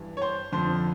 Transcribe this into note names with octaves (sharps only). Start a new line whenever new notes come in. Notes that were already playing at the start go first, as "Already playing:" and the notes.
Already playing: G2 E3
C#5
C5
F2 D3 F3 C5